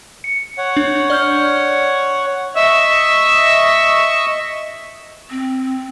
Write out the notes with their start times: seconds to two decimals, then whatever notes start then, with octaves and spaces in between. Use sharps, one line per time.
0.24 C#7
0.58 C#5 F#5
0.77 D4
1.10 D5 F6 G6
2.56 D#5 E5 C#6 E6
5.31 C4